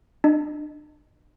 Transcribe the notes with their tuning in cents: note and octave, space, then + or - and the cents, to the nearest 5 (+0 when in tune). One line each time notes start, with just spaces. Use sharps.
D4 +35 D#5 +0